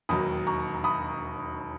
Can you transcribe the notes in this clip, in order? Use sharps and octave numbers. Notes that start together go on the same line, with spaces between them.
E1 D#2 D#3 F#3 B5 D#6
A#5 C#6
B5 D#6